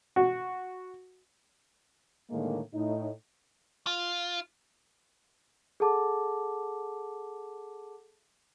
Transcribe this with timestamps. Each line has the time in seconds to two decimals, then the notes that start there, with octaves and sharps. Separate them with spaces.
0.16 F#4
2.30 A2 D3 D#3 G#3 A#3
2.74 A2 D#4
3.87 F4
5.80 G#4 A4 F#5 A5 D6